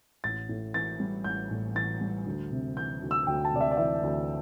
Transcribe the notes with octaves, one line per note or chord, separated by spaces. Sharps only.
A1 A6
A2
E3 A6
G3
A1 G6
A2
E3 A6
G3
D2
C3
E3 G6
D2
E6
D2 G5
A5
C3 D5
E5
D5
E3 E5
D2